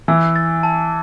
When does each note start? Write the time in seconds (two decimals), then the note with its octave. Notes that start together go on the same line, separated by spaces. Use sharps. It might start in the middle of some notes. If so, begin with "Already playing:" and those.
0.08 E3 E6
0.36 A6
0.63 A5